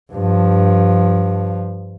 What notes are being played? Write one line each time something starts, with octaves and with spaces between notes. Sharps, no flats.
G2 F3